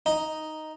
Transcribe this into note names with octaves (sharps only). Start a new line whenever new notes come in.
D#4